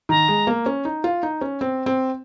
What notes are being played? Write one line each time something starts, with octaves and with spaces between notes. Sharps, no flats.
D#3 A#5
G#3
A#3
C#4
D#4
F4
D#4
C#4
C4
C4